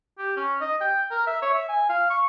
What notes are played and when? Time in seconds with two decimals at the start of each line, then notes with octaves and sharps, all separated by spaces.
0.18 G4
0.37 C#4
0.61 D#5
0.81 G5
1.11 A#4
1.27 E5
1.42 C#5
1.54 E5
1.69 G#5
1.89 F5
2.10 C#6